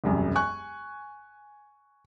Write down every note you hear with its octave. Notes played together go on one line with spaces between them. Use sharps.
E1 C2 F#2
G#5 C#6 F#6